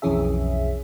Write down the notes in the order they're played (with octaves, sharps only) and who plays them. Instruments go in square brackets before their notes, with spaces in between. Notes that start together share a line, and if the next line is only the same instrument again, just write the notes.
[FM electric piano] B1 F2 E3 C#4 G#4 E5